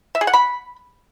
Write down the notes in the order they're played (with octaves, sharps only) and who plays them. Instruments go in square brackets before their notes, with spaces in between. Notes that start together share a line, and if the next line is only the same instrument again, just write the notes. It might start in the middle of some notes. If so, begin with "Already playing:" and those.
[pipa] E5
G#4
F#5
B5